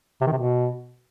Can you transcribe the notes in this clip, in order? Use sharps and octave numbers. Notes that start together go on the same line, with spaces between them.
C3
D#3
C3
B2